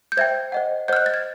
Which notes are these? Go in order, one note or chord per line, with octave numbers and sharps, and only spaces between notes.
G6
C5 E5 G5 G#6
C5 D#5 F#5
C5 D#5 F#5 F6 G6
F#6
A6
G#6